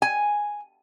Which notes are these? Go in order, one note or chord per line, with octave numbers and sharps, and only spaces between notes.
G#5